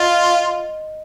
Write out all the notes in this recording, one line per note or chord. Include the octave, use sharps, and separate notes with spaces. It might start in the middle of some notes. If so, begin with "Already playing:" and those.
Already playing: F4 D#5